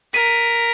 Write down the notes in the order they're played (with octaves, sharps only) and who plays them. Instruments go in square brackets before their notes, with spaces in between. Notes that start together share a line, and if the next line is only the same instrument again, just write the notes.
[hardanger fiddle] A#4 [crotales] B6 D#7